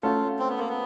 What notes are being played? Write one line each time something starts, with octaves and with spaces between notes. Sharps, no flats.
A3 C#4 F4 F#4 A4
C4
B3
A#3
B3